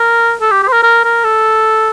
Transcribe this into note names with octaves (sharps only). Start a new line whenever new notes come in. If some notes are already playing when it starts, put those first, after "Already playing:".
Already playing: A#4
A4
G4
G4
C5
A#4
A#4
A#4
A4